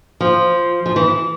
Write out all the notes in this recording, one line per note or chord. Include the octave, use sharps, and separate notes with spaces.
F3
F3
E3